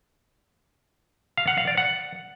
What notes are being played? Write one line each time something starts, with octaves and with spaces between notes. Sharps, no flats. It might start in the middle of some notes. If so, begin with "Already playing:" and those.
F5
F#5
F5
D5
F#5